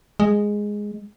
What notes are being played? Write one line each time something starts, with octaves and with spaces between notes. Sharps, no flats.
G#3